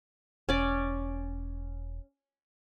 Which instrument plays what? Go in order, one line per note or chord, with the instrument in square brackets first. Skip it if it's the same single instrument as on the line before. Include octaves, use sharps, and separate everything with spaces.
[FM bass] E1 [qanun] C#4 D5